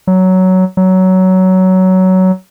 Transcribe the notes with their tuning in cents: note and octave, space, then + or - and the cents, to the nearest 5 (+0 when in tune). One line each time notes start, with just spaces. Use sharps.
F#3 +10
F#3 +15